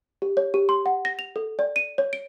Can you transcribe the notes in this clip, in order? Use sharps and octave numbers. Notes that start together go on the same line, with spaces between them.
G4
C#5
G4
C6
F#5
A#6
F7
A4
D5
D#7
C#5
D7